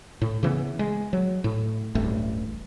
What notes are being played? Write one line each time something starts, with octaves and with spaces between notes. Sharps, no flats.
A2
C#3 E3 B3
G#3
F#3
A2
D1 A1 G2 A3